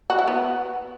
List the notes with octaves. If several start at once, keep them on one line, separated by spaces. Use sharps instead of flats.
F#4
E4
B3